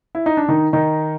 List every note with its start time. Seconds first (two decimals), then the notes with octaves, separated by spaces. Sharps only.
0.15 E4
0.26 D#4
0.37 D4
0.49 D#3 D#4
0.73 D#3 D#4